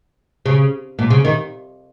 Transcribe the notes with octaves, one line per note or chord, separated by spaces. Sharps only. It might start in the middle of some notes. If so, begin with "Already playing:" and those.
C#3
A#2
C#3
D#3